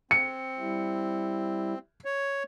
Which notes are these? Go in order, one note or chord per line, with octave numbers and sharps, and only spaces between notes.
C4 C#7
G3 E4
C#5